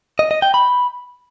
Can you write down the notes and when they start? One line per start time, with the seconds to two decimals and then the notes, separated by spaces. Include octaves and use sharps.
0.19 D#5
0.31 D#5
0.42 G5
0.54 B5